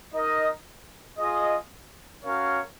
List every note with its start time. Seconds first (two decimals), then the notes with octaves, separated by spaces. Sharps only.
0.12 D#4 A#4 D#5
1.18 F4 G#4 D#5
2.24 C#4 F#4 A#4 C#5 F5